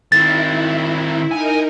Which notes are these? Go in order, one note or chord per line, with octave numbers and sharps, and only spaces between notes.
D#3 C4 E4 A6
D#4 A#4 G#5